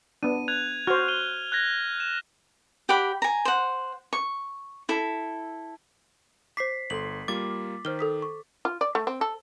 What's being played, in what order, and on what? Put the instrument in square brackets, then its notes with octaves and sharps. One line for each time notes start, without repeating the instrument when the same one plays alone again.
[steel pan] B3 D4 [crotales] D#7
[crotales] F#6 G#6 F7
[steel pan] F#4 C5 [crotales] F6
[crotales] D#7 G7
F#6 G#6 A#6
E7
[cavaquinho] G4 D5 F#5 B5
G#5 A#5
C5 F#5
C#6
E4 A4
[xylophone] C5 D6 [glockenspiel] B6 C7
[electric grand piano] G1 C6 [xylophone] A4 B6 [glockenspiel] F#7
[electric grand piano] G3 A#3 F4 [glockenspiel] D6 A6
[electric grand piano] D#3 [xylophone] C5 F6 G7
[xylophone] A4 D#6 B6
C#6
[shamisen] F4
D5
A3
C4
A4